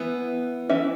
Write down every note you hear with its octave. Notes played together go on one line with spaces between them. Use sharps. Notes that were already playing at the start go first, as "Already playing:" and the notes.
Already playing: E3 B3
E3 C#4 E5